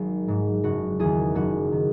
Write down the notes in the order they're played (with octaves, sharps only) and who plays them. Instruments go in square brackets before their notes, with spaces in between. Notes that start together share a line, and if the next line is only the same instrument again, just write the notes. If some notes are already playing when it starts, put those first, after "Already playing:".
Already playing: [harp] G#1 G#2 F#3
G#2 F#3
F#1 F#4
E2 D#3 G#4
F#1 F#4
D#3